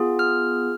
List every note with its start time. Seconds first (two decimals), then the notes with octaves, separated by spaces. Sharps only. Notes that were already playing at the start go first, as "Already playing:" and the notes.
Already playing: B3 F4 G#4
0.19 F6